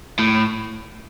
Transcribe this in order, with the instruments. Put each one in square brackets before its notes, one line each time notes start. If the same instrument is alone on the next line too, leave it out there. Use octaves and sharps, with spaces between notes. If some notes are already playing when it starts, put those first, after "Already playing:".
[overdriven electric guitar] A2